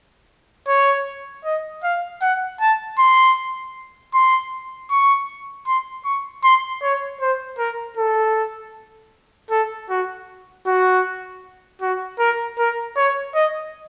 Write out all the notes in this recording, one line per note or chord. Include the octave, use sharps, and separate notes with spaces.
C#5
D#5
F5
F#5
A5
C6
C6
C#6
C6
C#6
C6
C#5
C5
A#4
A4
A4
F#4
F#4
F#4
A#4
A#4
C#5
D#5